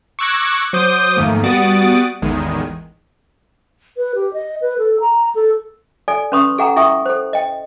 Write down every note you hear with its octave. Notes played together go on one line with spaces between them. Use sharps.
C#6 D6 E6 F#6 G#6 A#6
F#3 C5 D6 D#6 G6
F2 G#2 D#3 A3 A#3
G3 B3 F#4 D#6 A6 D7
A1 E2 D#3 G#3
B4
G4
D#5
B4
A4
A#5
A4
A4 D5 G#5
C#4 B4 C6 C#6 D#6
G#4 A4 F#5 G5 A#5
E4 G#4 E5 G5 C#6 D#6
A4 C5
D#5 G5